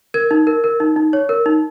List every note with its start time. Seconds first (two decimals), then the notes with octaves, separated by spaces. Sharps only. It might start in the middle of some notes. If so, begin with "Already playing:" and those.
0.14 A#4 G#6
0.31 D#4
0.47 A#4
0.64 A#4
0.80 D#4
0.96 D#4
1.13 C#5
1.29 A#4
1.46 D#4